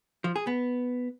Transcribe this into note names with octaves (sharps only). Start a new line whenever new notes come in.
F3
G#4
B3